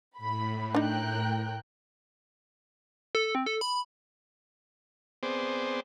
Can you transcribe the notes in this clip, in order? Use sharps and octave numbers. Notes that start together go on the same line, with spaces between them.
A2 B5
D4 D#4 A#4 G5 F#6
A4
C4
A4
B5
B3 C4 G#4 C5 D5